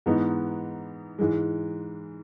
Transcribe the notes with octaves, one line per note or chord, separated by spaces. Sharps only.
G#2 E3 B3 D#4
G#2 E3 G#3